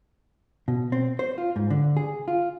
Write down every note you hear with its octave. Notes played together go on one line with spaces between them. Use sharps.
B2
C4
C5
F4
G#2
D3
G#4
F4